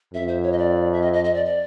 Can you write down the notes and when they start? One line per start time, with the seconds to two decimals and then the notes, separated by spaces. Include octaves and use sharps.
0.14 F2 E5
0.28 C5
0.43 C#5
0.52 D#5
0.58 D5
0.92 E5
1.02 D#5
1.13 D#5
1.24 D#5
1.34 D5
1.45 D5